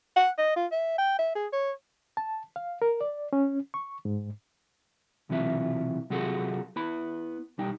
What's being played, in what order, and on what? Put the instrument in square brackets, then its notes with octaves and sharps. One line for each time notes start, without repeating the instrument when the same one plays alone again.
[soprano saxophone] F#5
D#5
F4
E5
G5
E5
G#4
C#5
[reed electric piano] A5
F5
A#4
D5
C#4
C#6
G#2
[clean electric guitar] B1 C3 E3 F#3 F4 E5
C3 F#3 F4 F#4 G#4 A4
B3 E4 B5
B1 G3 D#4 G5